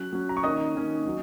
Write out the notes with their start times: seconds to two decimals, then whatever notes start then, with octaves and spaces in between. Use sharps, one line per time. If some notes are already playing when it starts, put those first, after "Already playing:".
Already playing: F#3 C#4 F#6
0.13 F#3 C#4
0.29 A#5
0.37 C#6
0.43 D#3 A#3 C#4 D#5 D#6
0.75 D#3 A#3 C#4
1.06 F#3 C#4